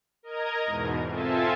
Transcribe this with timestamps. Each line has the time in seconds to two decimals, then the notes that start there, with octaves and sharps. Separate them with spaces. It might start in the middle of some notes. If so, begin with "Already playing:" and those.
0.23 A#4 D#5 A#5 G#6
0.65 E2 G#2 B2
1.07 C4 F4 A4 E5 G#5 A5